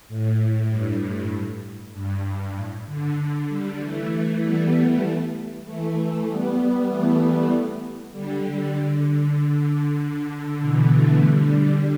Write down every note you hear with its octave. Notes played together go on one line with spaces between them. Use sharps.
A2
G2
G2
G2
A2
D3
D3
D3 G3
E3 A3
G3 B3
E3 A3
E3 A3
E3 A3
G3 B3
E3 A3
E3 A3
D3 G3
D3
D3
B2 E3
E3 A3
D3 G3